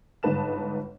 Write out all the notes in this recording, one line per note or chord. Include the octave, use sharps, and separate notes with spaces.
G1 G#2 D#4 B4 A5 E7